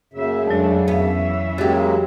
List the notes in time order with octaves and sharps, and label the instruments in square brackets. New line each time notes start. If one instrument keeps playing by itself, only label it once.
[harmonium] F#2 C#3 [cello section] A#3 E5
[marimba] F2 F#3 [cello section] G#3 A3 D4
[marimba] F2 F5 [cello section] E3 C#4 E5 [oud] B3
[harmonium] C#3 G#3 A#3 [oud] F#3 G4 [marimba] A6 A#6